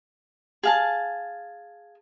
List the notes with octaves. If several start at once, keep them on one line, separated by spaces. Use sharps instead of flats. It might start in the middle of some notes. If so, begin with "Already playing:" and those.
G#4 F5 A5